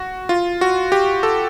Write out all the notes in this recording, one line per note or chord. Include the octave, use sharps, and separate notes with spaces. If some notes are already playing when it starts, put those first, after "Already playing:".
Already playing: F#4
F4
F#4
G4
A4